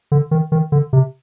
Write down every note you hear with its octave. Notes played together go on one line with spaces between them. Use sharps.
D3
D#3
D#3
D3
C3